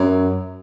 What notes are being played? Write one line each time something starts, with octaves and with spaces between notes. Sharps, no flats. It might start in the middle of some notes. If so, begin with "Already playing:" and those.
Already playing: F#2